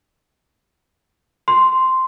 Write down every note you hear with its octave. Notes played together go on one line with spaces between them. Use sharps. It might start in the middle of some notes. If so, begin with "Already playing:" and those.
C6